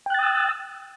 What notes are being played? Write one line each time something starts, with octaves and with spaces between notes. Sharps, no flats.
G5 D#6 E6 F#6 A6